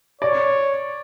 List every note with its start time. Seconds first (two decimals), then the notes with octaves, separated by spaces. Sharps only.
0.21 C#5 D5